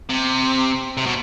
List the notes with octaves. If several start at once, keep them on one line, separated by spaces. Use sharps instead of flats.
C3
C3
B2